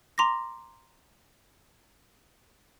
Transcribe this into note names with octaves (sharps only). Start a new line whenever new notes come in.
A#5 C6 D6 A#6